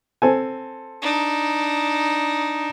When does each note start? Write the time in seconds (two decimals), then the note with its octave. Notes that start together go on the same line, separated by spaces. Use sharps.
0.22 C4 A4 G#5
1.02 D4 D#4